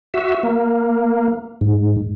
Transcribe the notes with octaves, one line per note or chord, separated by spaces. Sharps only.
F#4 E5
A#3
G#2